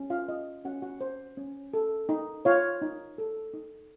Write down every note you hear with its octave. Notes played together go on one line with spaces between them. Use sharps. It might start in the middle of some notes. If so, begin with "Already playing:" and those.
Already playing: C#4
F4 F5
F4 D#5
C#4 F#4 F#5
F#4 F#5
C5
C#4
A4
D#4
F4 C#5 F5
D#4
A4
D#4